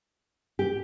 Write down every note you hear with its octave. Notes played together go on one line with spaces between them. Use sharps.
G4